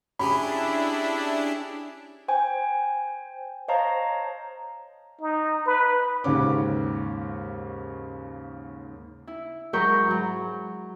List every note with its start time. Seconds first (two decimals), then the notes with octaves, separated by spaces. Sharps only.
0.19 C#4 D4 E4 G4 G#4 B5
2.28 C5 G5 G#5
3.68 C5 C#5 D#5 F5 A5 A#5
5.21 D#4
5.66 B4
6.24 D#2 G#2 C#3 C#4 D6
9.27 E4
9.73 G#2 F#3 A#4 B5 C#6 G6
10.10 F#3